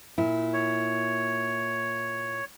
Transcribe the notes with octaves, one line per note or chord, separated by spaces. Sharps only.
A#2 E4
C#5